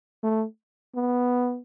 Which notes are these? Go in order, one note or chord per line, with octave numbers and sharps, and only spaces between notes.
A3
B3